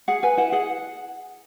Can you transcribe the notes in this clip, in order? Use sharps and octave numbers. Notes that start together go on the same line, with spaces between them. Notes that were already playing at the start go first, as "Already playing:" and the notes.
G#4 F#5
B4 G#5
E4 F#5
G#4 F#5